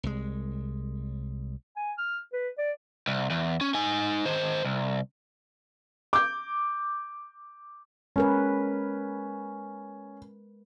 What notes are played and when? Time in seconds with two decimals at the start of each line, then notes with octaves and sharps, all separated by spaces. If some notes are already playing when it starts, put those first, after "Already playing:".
0.03 C2 G#3
1.76 G#5
1.98 F6
2.33 B4
2.58 D5
3.08 C2
3.30 E2
3.61 C#4
3.74 D#4 G#5
4.25 D#3 C5
4.64 C2
6.13 D6 G6
8.16 G#3 C#4 A#4 B4